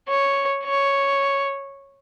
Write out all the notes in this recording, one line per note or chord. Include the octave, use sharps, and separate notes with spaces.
C#5
C#5